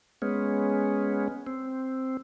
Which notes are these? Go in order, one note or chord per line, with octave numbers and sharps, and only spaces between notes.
G#3 B3 C#4
C4